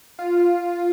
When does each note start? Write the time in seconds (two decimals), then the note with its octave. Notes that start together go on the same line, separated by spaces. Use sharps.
0.19 F4